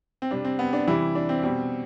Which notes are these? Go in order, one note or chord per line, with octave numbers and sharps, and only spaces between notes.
C4
C3 G3 D4
C4
B3
D4
C3 E3 G3 E4
D4
C4
B2 G3